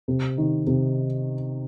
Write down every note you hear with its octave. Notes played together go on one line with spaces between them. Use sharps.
C3
D#3
C3